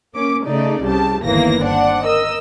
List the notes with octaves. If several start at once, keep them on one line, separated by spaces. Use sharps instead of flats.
A#3 C#4 D6
C#3 A3 D#4 D5
C2 C#3 G4 A5
G1 D#2 E3 A#3 B3 A#6
C4 D4 D5 F#5
A#4 D#5 E6